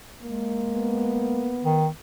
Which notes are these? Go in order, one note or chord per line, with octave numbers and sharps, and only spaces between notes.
G#3 A#3
B3
D#3